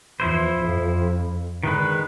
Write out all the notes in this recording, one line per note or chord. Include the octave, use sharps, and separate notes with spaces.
E2 F3 E4 C5
F2
D3 D#3 G#3 B4